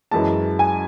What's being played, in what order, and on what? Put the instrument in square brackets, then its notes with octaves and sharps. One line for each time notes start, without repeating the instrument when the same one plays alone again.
[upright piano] F#2 E3 G#3 A5
G#5